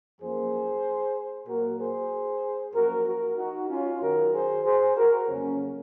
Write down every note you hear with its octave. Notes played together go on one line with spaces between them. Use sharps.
F#2 F3 A#3 G#4 C5
A#2 F#3 A#3 F#4 A#4
G#4 C5
F#2 F3 A#3 F#4 A#4
F#4 A#4
D#4 F#4
C#4 F4
F#2 D#3 F#3 F#4 A#4
G#4 C5
G#4 C5
F#4 A#4
F2 C#3 F#3 A#3 C#4